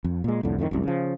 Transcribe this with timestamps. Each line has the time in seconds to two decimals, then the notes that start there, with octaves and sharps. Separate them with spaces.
0.04 F2
0.24 A#2 G#3
0.43 C2 F2 A2 D3
0.59 F2 A2 D3 D#3
0.71 F1 C2 F#2
0.83 C#3 F3